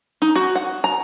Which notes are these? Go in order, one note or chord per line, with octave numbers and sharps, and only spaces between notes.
D#4
F#4
F#5
A#5